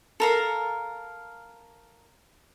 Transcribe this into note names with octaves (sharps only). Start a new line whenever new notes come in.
A4 A#4 F5